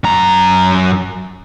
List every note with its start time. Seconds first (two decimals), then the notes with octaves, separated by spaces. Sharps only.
0.04 F#2 A#5